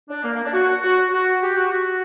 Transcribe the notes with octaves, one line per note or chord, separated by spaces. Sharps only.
D4
A#3
A#3
D4
F#4
F#4
F#4
G4
F#4
F#4